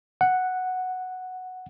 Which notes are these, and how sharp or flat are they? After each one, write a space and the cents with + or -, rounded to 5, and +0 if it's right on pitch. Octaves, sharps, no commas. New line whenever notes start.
F#5 +0